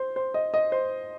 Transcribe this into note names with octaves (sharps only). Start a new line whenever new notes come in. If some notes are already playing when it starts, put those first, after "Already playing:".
Already playing: C5
C5
D#5
D#5
C5